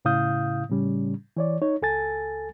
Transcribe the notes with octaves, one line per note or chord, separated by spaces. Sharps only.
A2 C#3 E4 F5 D#6 G6
A2 C#3 G3 C#4
E3 C#5 D5
D#4 C#5
C#2 A4 G#5 A6